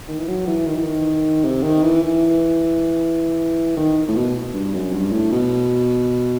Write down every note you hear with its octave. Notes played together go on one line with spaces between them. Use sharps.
D#3
E3
F#3
E3
D#3
E3
D#3
C3
D#3
E3
E3
D#3
A2
B2
G2
F#2
G2
A2
B2